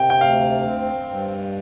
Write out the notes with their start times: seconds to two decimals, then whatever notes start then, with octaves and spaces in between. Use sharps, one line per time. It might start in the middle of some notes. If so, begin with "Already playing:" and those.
Already playing: C3 G5
0.10 G5
0.21 D2 F5
0.65 C4
1.09 G2